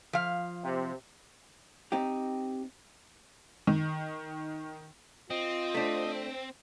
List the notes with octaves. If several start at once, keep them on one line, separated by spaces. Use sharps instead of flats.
F3 F5
C3
C4 D#4 G4
D#3
C4 F4 D#5
A3 D4